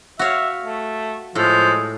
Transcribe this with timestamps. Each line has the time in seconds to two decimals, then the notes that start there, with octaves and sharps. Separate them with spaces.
0.19 F#4 C#5 E5 F5
0.64 A3
1.35 A2 F3 G#3